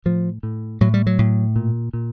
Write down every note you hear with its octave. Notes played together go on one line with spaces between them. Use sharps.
A2 F3
A2
A2 F#3
G3
F#3
A2
A#2
A#2